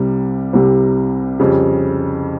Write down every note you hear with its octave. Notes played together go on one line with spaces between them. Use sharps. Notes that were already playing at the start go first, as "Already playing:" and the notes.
Already playing: C2 C3 G3
C2 C3 G3
F2 C#3 G3